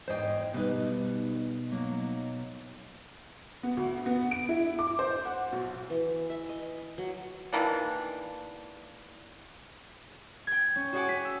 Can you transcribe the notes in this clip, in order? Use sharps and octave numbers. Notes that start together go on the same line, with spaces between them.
E2 G#2 C5 D#5 G5
B2 G3 D#4 B4
F#3 A#3
B3
D2
B3
D7
E4
D6
C5
F#5
B1
E3
E5
D#5
F#3
D#3 E3 A#3 D4
G5 G#6
C#4
F#4 G#4 C#5 F#5 G#5 D6
B6
E6